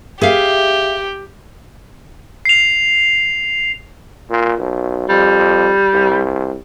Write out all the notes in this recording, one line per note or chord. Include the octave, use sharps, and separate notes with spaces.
G4 G#4 E5 F5
C7 F7
A#2
B1
F2 G3
C2